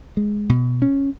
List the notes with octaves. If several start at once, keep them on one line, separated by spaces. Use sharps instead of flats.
G#3
B2
C#4